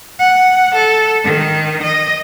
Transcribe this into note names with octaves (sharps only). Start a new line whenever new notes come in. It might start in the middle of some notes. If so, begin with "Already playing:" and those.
F#5
A4
D#3
D#5